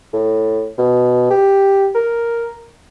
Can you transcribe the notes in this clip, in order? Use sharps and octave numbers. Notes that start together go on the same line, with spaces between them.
A2
B2
G4
A#4